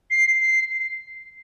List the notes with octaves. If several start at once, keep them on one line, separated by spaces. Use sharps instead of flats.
C7
C7